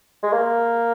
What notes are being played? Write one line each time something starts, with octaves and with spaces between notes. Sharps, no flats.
G#3
A#3